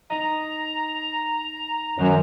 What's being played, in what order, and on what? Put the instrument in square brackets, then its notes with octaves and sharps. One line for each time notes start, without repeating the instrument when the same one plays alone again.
[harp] D#4 D#5 [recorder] A#5
[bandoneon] F#2 [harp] D#3 F#3 C5